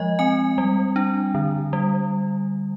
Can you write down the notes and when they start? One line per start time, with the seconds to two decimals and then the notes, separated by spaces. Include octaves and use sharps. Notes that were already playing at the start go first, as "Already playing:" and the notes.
Already playing: F3 G#3 D#5
0.19 C4 G#5
0.58 G3
0.96 D4
1.35 D3
1.73 G3